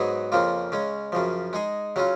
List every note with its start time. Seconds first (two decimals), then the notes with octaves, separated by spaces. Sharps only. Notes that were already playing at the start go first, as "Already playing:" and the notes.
Already playing: G#2 F#3 B3 D#4 G#4
0.32 F2 C#3 F3 A#3 F4
0.72 C#3 G#3 C#4
1.12 F#2 C#3 F3
1.53 G#3 D#4 G#4
1.96 C#3 F#3 C#4 F4